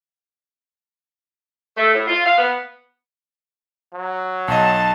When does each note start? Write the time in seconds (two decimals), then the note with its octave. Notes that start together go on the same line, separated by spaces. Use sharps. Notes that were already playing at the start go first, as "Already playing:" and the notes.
1.77 A3
1.94 A2
2.07 F4
2.25 F5
2.37 B3
3.93 F#3
4.48 B1 D#5 A5